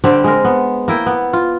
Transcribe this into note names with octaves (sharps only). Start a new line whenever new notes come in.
D3 G3 C4 G4
G#3 A#4
B3
A#3 E4 G5
B3
F4